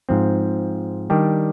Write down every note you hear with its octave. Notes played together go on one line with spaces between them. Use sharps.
G#2 F3 C4
D#3 G3 D4 G4